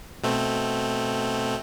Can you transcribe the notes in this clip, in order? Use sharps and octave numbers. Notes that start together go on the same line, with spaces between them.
B2 A3 C4